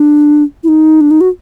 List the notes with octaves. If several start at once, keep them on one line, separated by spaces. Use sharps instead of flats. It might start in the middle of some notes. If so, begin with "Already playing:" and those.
Already playing: D4
E4
D#4
D4
D#4
F#4